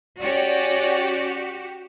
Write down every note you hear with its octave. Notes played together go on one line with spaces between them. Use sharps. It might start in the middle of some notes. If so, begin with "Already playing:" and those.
C#4 F#4 G4 D5